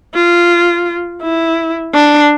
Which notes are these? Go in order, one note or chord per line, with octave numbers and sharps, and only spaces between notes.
F4
E4
D4